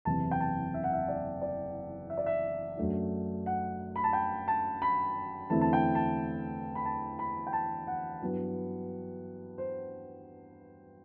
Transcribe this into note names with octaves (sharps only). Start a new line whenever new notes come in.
F#1 E2 C3 E3 A5
G5
A5
E5
F#5
E5
D5
D5
E5
D5
E5
F#2 F#3 A3 D4
F#5
B5
A5
G5
A5
B5
E2 D3 A3 C4 E4 A5
A5
G5
A5
B5
A5
B5
G5
A5
F#5
G2 F#3 B3 E4
C5